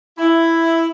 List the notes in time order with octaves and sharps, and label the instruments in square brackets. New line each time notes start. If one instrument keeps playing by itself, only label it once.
[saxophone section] E4